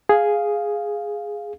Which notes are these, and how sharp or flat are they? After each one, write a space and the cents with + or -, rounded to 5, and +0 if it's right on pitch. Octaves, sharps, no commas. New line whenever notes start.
G#4 +0 F5 +0